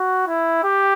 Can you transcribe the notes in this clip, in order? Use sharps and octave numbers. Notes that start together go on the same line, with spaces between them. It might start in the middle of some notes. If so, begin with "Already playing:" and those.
Already playing: F#4
E4
G4